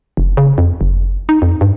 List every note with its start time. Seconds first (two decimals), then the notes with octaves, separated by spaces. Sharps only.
0.17 F1
0.37 C#3
0.58 F2
0.81 F#1
1.29 D#4
1.42 F2
1.61 G2